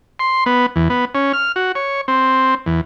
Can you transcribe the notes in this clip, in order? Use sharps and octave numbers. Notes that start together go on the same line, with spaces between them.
C6
B3
E2
B3
C#4
F6
F#4
C#5
C4
E2